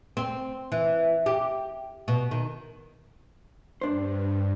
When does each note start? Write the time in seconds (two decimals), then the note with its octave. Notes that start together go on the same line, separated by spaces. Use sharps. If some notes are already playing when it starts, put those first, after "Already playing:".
0.17 C4
0.72 E3
1.26 G4
2.08 B2
2.31 D#3
3.81 G2 D4 C5